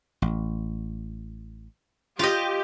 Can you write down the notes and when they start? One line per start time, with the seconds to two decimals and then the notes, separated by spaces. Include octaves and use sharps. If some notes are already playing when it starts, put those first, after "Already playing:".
0.22 A1
2.19 F4 G4 D#5